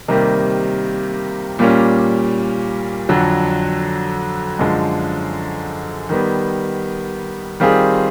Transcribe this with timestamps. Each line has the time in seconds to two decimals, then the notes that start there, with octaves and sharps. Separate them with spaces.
0.08 C3 D#3 G3 A#3
1.59 A#2 G3 A#3 C#4
3.09 F2 D3 F#3
4.59 F#2 D3 F3 G#3
6.09 D#3 G3 B3
7.60 D#3 G3 C4 F4 G#4